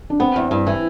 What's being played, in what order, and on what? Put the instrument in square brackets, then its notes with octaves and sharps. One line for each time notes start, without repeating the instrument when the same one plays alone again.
[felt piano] D4
[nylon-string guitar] B3 [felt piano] C4
[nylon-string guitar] E2
G2
E3